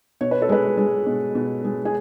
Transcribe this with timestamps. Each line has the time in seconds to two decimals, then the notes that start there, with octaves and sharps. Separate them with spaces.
0.21 B2 C#5
0.31 B4
0.42 A4
0.49 G#3 B4
0.77 G#3
1.06 B2
1.35 B2
1.64 G#3
1.85 G#4